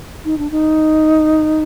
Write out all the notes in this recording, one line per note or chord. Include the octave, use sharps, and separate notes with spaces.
D#4
D4
D#4